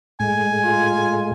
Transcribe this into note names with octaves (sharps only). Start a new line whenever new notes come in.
A2 G#3 G#5
F4